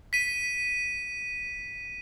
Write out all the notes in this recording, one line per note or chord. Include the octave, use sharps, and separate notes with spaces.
B6 D#7